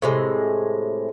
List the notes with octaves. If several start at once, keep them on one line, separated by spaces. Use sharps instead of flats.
A2 C3 G#3